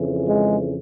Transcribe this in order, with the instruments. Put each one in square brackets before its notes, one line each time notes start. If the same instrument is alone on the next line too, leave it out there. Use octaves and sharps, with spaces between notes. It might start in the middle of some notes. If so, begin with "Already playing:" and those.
Already playing: [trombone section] F2 C#3 E3
G#3